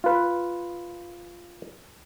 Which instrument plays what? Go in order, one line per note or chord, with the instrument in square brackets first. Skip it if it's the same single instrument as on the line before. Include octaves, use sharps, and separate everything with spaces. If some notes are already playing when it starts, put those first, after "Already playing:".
[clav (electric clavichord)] F4 B4